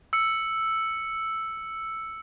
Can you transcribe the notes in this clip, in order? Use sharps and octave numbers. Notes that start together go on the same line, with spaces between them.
E6 C#7